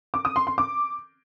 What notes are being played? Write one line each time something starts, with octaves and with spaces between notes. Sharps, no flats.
D6
D#6
C6
C6
D6